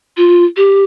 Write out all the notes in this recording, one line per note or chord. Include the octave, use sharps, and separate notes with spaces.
F4
G4